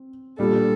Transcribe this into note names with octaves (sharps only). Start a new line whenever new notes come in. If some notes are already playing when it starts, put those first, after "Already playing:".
Already playing: C4
A#2 G3 D4 A4